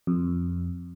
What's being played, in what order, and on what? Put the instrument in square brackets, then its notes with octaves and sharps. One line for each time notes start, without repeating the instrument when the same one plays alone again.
[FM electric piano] F2